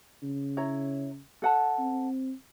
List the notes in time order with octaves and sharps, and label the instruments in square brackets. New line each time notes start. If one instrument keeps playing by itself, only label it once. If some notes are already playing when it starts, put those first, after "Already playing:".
[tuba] C#3
[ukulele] E4 C#5 A#5
A4 F#5 A5
[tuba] C4